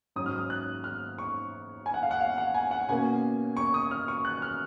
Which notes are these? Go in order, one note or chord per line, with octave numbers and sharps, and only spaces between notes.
G#2 F#3 C#4 D#6
F6
D#6
F#6
F6
C#6
G#5
F#5
F5
F#5
F5
F#5
G#5
F#5
B2 A#3 C#4 G#5
C#6
D#6
F6
C#6
F#6
F6